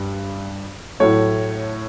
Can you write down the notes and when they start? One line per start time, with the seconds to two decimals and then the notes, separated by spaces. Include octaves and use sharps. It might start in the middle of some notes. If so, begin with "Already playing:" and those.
Already playing: G2
1.00 A2 F#3 A3 C#5